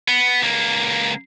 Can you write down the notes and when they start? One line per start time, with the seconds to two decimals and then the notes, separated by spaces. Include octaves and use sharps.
0.08 B3
0.43 C#2 A#3